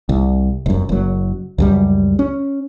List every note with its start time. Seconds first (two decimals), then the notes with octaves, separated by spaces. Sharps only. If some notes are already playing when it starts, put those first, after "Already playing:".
0.09 C2
0.66 F1 F#2
0.89 F#1 F#3
1.58 C#2 F#2 G3
2.19 C#4